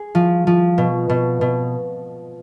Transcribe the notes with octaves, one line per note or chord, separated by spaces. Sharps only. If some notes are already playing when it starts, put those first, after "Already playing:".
Already playing: G#4
F3
F3
B2
B2
B2